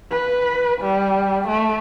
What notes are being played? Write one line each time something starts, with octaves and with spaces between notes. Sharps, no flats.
B4
G3
A3